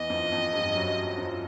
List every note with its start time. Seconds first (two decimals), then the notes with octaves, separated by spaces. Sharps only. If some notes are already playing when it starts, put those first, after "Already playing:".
Already playing: E2 E3 D#5
0.10 F2 F3
0.32 F2 F3
0.53 G2 G3
0.75 F#2 F#3
1.18 F2 F3